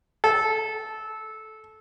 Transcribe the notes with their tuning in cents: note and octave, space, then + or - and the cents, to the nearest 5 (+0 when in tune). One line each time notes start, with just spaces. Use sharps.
A4 -15